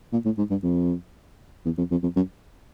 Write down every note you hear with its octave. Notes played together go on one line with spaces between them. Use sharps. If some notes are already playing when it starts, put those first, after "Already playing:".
A#2
A2
G#2
G2
F2
E2
F2
F2
F2
F#2